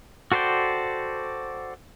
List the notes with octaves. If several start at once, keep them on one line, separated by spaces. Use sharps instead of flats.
F#4 A4 C5 D5 G5